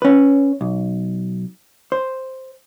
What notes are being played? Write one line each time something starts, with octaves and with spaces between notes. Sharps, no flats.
C#4 B4
B1
C5